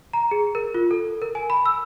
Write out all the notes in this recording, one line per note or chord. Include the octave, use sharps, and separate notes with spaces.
A#5
G#4
A#4
F4
A4
A#4
G#5
B5
E6